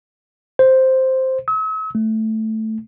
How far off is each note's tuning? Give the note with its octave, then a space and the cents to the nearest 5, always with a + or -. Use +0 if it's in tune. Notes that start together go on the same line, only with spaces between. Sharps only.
C5 +0
E6 -45
A3 +0